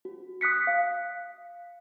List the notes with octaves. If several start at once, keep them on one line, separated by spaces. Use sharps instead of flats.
F#4
D#6 F#6 B6 C#7
F5